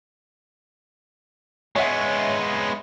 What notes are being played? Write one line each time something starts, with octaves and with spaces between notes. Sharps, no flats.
G#3 B3 C#5 E5 F#5